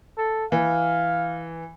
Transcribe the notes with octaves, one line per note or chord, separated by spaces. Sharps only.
A4
E3 F5